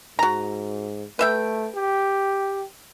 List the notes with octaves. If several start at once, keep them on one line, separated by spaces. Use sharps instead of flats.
G#2 F#4 A#5
A3 B4 E5 G5
G4